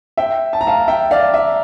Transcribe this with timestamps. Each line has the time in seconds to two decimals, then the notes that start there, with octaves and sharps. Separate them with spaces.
0.17 E5 G5
0.53 A5
0.61 A#5
0.67 F5 A5
0.88 E5 G5
1.11 D5 F5
1.34 E5